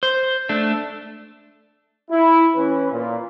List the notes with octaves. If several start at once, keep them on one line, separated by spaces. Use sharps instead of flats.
C5
A3 D4
E4
E3 C#4 B4
A#2